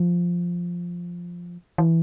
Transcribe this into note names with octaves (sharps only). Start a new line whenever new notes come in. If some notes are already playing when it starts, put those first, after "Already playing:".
Already playing: F3
E3